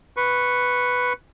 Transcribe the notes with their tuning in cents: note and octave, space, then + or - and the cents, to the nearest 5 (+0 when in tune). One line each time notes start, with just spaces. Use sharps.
B4 +0 C#6 -10